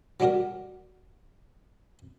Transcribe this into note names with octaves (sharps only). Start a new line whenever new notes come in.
F#3 G3 D4 F#4 G4 A#4